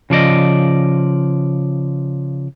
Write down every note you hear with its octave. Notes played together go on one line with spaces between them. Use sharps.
C#3 F3 D5 D#5